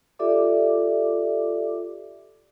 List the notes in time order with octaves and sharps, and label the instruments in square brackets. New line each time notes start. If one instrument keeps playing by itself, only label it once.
[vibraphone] F4 G4 A4 D5 E5 D6